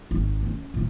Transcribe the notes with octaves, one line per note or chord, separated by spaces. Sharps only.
G#1
C4 C#4
A2 C#3